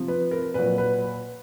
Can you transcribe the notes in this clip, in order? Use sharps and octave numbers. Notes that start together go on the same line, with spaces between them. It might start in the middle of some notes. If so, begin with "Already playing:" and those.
Already playing: C3 F3
B4
A#4
A#2 F#3 B4
B4